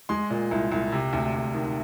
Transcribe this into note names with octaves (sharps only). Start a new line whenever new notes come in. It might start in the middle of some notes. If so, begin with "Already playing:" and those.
G#3 C6
A#2
C2
C2
C3
D2
D2
D#3